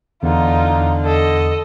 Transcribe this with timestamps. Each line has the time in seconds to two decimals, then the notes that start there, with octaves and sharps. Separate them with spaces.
0.23 E2 D3 D#4 F4
1.05 A4 D#5